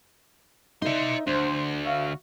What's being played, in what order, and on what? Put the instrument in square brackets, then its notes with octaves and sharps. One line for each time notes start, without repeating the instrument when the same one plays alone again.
[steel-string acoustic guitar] D#4 A#4 E5 [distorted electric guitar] D5 C6
[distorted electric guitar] D2 [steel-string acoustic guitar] D4 [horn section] C5
[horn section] F#4 E5 F5